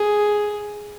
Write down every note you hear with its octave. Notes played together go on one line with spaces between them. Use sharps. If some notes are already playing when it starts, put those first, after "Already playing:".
Already playing: G#4